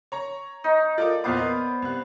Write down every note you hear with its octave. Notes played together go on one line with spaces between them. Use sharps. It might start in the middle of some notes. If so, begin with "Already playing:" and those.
C#5 A#5 C#6
D#4
F4 A4 A#4 D5
E2 A#2 B3 C5 F5 D6
A#4 D#5
C2 F#6